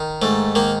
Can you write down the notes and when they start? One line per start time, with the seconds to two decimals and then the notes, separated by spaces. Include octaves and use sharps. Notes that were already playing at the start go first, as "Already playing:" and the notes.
Already playing: D#3
0.22 G#2 A3
0.55 D#3 A#3